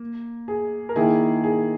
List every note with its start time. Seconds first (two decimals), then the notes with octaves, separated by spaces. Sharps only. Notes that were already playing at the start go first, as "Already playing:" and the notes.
Already playing: A#3
0.48 G#4
0.89 A#4
0.96 D#3 A#3 E4 G#4
1.44 G#4